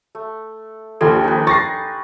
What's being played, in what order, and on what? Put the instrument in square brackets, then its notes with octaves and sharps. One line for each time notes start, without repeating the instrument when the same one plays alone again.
[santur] A3
[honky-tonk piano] A#1 D#2 F3 [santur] G3 G#5 C6 [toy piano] A4
[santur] D#4 B4
[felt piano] C#6 [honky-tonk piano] A6 A#6 C7